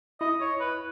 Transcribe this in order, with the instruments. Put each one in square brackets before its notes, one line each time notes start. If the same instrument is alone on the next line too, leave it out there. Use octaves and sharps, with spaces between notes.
[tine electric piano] E4 [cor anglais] D#5
[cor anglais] C#5
B4